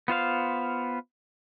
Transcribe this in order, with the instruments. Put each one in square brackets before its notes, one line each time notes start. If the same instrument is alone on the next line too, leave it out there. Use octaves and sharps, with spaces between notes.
[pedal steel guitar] B3 F4 C5 F5